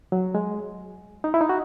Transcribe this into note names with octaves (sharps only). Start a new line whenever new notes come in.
F#3
G#3
D#4
E4
D#4
F#4